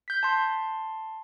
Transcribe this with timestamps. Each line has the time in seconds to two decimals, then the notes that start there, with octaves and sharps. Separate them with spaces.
0.08 G6 B6
0.23 A5 C6